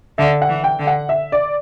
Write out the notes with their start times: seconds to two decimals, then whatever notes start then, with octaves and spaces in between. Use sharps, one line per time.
0.18 D3 E5
0.42 F#5
0.49 E3
0.64 G5
0.79 D3
0.87 F#5
1.09 E5
1.32 D5